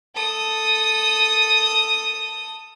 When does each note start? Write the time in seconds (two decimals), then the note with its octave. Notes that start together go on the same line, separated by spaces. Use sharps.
0.15 A4 D#6